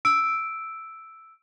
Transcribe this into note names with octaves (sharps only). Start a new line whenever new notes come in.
E6 D7